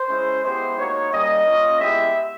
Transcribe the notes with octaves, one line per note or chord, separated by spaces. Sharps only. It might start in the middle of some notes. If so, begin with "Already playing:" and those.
Already playing: C5
G#3 C#4 E4
G#3 B3 E4 G4 C5
A#3 D#4 F#4 C#5
G3 A#3 C#4 D#5
A#3 C#4 F4
G#3 B3 E4 G4 E5